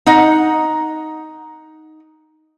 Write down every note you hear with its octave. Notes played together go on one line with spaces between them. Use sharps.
D#4 D#5 F#5